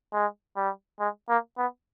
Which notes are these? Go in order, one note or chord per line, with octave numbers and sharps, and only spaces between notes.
G#3
G3
G#3
A#3
B3